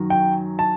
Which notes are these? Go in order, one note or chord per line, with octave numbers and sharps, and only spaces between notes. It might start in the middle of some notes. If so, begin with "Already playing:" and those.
Already playing: F#2 D#3 F#3
G5
A5